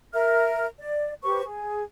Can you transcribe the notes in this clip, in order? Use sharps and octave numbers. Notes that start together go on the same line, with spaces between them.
A#4 E5 F6
D5
G4 B4 C5 C#6
G#4